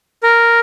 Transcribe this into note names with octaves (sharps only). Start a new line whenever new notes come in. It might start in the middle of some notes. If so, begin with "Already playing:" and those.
A#4